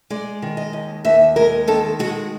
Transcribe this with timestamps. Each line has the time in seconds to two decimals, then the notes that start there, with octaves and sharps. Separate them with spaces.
0.10 G#3 D5
0.42 D#3
0.57 D#5
0.73 D#2
1.05 D#2 E5
1.36 G#3 A#4
1.68 D#3 A4
1.99 G#3 F#4